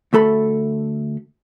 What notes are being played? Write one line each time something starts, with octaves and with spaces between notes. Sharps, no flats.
D2 A3 A4 B5